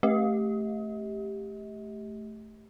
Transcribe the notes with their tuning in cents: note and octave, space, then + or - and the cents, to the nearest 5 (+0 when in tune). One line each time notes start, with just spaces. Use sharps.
A3 -10 G4 +5 D#5 +40